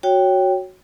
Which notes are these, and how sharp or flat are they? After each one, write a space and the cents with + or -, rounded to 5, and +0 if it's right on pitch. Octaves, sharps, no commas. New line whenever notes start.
F#4 +0 C#5 +0 G5 +0